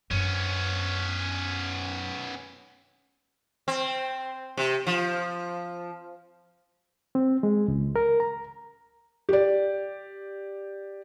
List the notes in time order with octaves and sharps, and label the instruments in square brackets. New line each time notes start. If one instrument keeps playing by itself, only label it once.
[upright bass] F#2 D4 [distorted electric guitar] B3 C#4
[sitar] C4
C3
F3
[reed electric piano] C4
G#3
C#2
A#4
A#5
[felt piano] G4 D5